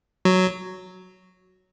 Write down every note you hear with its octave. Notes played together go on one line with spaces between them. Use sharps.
F#3